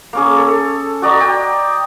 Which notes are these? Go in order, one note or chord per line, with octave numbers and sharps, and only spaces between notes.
A#3 C#4 G#4
A4
F#4 D5 D#5 A#5
G5